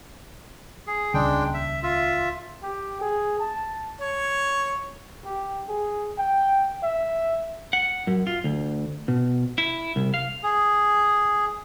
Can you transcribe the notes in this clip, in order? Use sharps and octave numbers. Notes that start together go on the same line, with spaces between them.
G#4
D#1 C#2 G#3 D4 G5
E5
F4 E5
G4
G#4
A5
C#5
G4
G#4
G5
E5
F#5
F#2
F4
D2
B2
E4
C2
F5
G#4